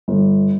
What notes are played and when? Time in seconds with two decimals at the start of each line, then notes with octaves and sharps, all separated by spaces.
0.08 G1